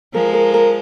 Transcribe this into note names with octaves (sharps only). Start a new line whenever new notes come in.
F3 G#3 A#4
A#4
A#4